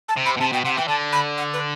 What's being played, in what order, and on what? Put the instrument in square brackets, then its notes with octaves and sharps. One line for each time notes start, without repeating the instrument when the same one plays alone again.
[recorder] A5
[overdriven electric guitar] C3
[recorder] B5
[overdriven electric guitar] B2
[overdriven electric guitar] C3 [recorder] A5
[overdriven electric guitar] B2 [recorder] G5
[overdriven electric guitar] C3 [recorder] F#5
[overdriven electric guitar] E3 [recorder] G5
[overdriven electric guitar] D3 [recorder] A5
[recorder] B5
F#5
B4